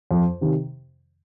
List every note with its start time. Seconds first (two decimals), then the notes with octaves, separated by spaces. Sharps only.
0.11 F2
0.41 C3 D#3